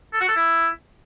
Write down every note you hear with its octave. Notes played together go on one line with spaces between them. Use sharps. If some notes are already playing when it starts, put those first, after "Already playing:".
A4
F#4
A4
E4